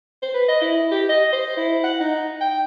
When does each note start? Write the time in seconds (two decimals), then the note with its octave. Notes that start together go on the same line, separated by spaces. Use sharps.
0.22 C5
0.34 B4
0.48 D#5
0.61 E4
0.91 G4
1.09 D#5
1.33 C5
1.57 E4
1.84 F#5
2.00 D#4
2.41 G5